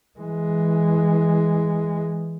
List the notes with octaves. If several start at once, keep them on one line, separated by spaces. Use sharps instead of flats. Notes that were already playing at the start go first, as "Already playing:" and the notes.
E3 G#3